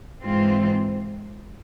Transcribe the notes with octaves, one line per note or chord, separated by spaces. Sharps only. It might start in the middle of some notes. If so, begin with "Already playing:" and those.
G#2 E3 G#3 C4 F4